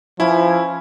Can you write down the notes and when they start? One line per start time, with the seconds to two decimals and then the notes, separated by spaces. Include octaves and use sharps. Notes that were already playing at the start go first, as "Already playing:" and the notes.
0.20 F3 C#4 E4 G#5 B5